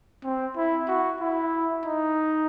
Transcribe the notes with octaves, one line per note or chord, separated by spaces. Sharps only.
C4
E4
F#4
E4
D#4